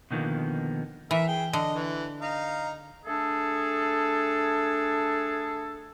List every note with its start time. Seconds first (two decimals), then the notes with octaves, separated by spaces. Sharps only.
0.11 B2 D3 D#3 F3 A#3 B3
1.11 E3 A#4 E5
1.28 G#4 G5
1.53 D3 D#5
1.75 E3
2.22 D#4 F5 A#5
3.06 A3 D4 G#4 A4